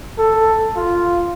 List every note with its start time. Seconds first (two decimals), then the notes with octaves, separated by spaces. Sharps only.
0.19 A4
0.76 F4